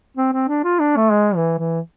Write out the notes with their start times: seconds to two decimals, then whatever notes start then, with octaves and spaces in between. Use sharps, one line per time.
0.17 C4
0.33 C4
0.48 D4
0.64 F4
0.80 D4
0.96 A3
1.11 G#3
1.36 E3
1.58 E3